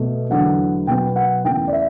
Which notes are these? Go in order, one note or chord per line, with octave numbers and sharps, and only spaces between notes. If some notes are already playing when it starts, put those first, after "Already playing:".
Already playing: B2 A3
E2 D3 F#3 A3 F#5
B2 F#3 B3 G5
F#5
E2 C#3 E3 A3 G5
D5
E5